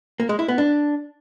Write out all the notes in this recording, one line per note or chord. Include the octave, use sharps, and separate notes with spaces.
A#3
G#3
E4
B3
D4